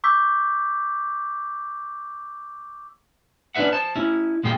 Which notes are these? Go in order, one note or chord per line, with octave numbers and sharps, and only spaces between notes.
C#6 D6 E6 G6 B6
C#4 D4 E4 B4 E5 F#5
C5 A5
C#4 E4
A#2 G#3 G#4 G5